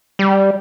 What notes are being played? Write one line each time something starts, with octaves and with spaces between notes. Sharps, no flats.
G3